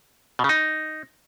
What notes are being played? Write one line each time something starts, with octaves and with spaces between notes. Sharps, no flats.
B2
C#3
D#4